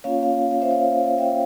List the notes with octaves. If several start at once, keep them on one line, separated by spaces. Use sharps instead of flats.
A#3 C#4 F4 C#5 F5
C#5 F5
C#5 F5
C5 E5
C#5 F5
E5 G5